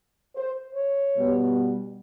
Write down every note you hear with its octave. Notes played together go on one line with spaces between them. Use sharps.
C5
C#5
B2 G3 B3